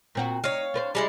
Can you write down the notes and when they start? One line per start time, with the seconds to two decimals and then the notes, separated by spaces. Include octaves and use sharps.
0.15 A#2 C4 F#4
0.44 D#4 C#5 F5
0.74 D4 B4 C5
0.95 G3 G#3 E4